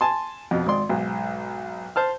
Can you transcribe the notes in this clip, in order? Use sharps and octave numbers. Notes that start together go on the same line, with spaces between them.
G#5 A5 C6
F2 B2
G#1 G#2 D5 C6
B1 G#2
C5 A5 F6